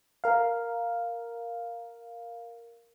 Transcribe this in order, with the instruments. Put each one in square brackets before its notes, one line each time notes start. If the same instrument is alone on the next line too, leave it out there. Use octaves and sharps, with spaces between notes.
[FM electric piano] A#4 F5